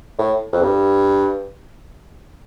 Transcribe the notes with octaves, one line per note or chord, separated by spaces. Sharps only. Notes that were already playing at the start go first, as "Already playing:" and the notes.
A2
F2
G2